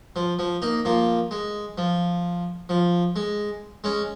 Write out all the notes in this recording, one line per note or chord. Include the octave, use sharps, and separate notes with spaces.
F3
F3
A#3 D#4
F3 A#3
G#3
F3
F3
G#3
G#3 C#4